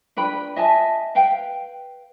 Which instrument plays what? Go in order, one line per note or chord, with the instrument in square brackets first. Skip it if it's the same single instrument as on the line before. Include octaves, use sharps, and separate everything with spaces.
[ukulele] D4 B4 G5 B5
D#5 E5 G#5 A5
B4 F5 G5